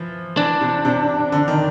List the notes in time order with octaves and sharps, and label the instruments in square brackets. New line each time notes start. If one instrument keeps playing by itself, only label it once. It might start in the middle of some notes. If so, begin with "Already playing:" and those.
Already playing: [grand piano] E3 F3
[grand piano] E3 [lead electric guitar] D4
[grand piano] C3
C3
D3
D#3